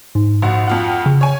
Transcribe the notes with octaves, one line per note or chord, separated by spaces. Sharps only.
G#2
A#1 F#4
F2 F4 F#5
C#3
C#5 G#5